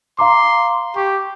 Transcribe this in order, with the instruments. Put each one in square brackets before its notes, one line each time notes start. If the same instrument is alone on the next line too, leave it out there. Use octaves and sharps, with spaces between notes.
[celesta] F5 A#5 D6 [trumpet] C6
[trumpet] G4 [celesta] C#6